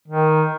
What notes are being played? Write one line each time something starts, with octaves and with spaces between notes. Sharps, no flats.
D#3